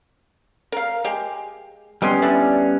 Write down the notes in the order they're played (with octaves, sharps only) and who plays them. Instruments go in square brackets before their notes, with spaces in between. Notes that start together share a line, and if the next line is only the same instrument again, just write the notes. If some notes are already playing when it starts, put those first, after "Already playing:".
[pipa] A#4 F5
G#3 G4
[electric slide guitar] G3 B3 C#4 [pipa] G4 D#5 C6
[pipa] D4 E4 D5